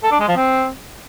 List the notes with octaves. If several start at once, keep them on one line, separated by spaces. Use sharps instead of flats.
A4
D4
G#3
F3
C4